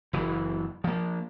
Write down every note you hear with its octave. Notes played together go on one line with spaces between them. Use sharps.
F#1 E3
F3 A#3